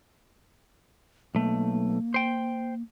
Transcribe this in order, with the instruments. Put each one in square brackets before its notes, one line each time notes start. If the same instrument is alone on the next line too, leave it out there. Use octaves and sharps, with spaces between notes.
[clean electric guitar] B1 A3 [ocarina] A#3
[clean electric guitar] C5 G5